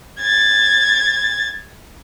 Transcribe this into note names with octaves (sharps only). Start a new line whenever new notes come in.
G#6 A6